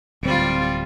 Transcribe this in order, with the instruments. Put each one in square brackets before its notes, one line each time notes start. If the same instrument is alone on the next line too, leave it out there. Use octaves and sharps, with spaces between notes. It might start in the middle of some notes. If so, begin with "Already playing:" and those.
[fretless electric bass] D1 C4 [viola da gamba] G3 F4